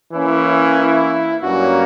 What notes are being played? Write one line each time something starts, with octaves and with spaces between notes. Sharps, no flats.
E3 A#3 C#4 E4
E4
G2 F#3 A#3 C#4 F#4